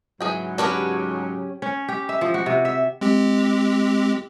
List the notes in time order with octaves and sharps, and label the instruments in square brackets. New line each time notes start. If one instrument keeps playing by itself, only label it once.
[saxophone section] G#2 C#3 F#3 [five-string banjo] E3 G#4 G5
[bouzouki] C#4 G4 C#5 [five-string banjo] D4 A#4 B4
[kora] C#4
G4
E5
F3
F#4
C3
E5
[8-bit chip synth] G#3 C4 G4